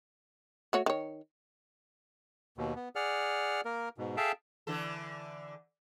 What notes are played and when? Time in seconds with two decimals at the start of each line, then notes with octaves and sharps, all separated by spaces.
0.73 A3 F#4 C#5
0.86 D#3 C#5
2.58 D#2 B2
2.76 B3
2.95 G#4 D5 F#5 F6
3.65 A#3 A#4
3.98 G#2 B2
4.17 G#4 A4 E5 F5 G5 A5
4.67 D3 E3 A4